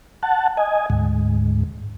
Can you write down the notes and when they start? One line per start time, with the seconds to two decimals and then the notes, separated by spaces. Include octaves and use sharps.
0.23 F#5 A5
0.57 D#5 G#5
0.90 D2 G#2